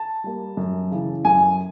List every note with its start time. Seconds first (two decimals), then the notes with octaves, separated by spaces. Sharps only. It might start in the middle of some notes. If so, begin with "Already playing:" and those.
Already playing: A5
0.24 G3 A#3
0.57 F#2
0.91 C#3 E3
1.25 F#2 G#5